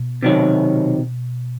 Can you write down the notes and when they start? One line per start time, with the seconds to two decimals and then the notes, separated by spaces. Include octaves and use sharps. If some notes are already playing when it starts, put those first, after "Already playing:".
Already playing: B2
0.23 C3 D#3 F#3